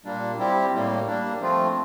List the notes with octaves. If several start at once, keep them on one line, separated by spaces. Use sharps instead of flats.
A#2 G3 A#3 D4
G3 C4 E4 G4
A2 G3 A#3
G3 A#3 D4
F3 A3 C4 F4